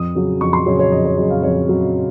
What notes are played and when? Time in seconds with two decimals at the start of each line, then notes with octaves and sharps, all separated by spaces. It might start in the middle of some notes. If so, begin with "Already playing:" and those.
Already playing: F2 D#6
0.15 C#3 F#3
0.41 F2 C#6
0.53 C6
0.66 C#3 F#3 C#5
0.79 C#5
0.92 F2 D#5
1.05 C#5
1.17 C#3 F#3 D#5
1.30 F5
1.43 F2 C#5
1.69 C#3 F#3